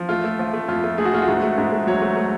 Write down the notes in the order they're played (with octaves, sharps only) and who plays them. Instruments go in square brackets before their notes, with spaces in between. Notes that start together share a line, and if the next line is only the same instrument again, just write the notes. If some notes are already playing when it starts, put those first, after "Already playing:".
Already playing: [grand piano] F3
A3 F4
A3
F3
A3
F2 F4
A3
A3 G#4
F#4
A3 F4
F#4
G#2
A3
G#2
A3
F#3 C#5
A3
A3